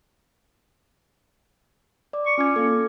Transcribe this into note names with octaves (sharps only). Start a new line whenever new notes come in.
D5 D6
C#6
C#4 F4 D6 G#6
A#3 A4